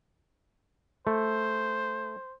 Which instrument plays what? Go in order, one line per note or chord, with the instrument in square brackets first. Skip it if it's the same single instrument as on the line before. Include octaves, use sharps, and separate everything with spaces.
[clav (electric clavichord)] A3 [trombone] C5